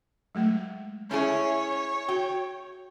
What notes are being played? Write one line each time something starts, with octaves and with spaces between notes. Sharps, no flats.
F#3 G#3 A3
C#4 E4 G#4 C#5
F#4 G5